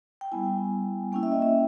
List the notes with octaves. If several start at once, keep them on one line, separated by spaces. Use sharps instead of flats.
G5
G3 B3 E4 G#5
A#3 C#4 E4 G5
E5
D#5
E5